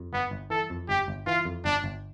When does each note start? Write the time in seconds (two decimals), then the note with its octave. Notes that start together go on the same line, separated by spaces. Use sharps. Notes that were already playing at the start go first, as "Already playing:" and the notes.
Already playing: F2
0.13 G1 B3
0.31 G1
0.50 E3 A4
0.70 F2
0.89 G1 G4
1.08 G1
1.27 E3 F4
1.45 F2
1.65 G1 D4
1.84 G1